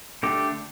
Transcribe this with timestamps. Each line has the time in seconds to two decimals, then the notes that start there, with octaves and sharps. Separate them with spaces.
0.23 D3 A3 D4 G4